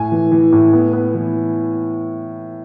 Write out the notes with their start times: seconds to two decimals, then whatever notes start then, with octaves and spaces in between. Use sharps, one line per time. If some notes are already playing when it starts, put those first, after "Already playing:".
Already playing: A2 G#5
0.12 E3
0.32 E3
0.52 A2
0.73 B3
0.93 B3
1.14 E3